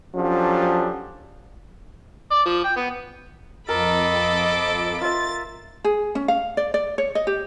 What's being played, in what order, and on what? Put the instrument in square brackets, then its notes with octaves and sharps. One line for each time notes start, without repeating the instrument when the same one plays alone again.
[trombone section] F3 F#3 C#4 D4 G4 A4
[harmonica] D5
F3
G5
B3
[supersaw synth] F2 [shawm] A4 [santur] A#4 [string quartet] D#5 B5 D6
[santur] F4 E5 [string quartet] A6
[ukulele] G#4
C#4
F5
D5
D5
C#5
D#5
G4